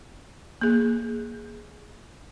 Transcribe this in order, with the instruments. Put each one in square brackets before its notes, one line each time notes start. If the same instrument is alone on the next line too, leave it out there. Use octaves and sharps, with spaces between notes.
[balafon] A#3 G#4